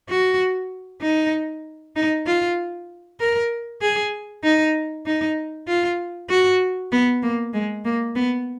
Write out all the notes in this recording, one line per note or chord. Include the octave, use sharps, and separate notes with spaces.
F#4
D#4
D#4
F4
A#4
G#4
D#4
D#4
F4
F#4
B3
A#3
G#3
A#3
B3